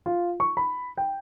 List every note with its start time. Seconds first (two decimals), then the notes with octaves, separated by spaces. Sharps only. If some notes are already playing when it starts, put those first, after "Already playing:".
0.06 F4
0.40 C#6
0.57 B5
0.97 G5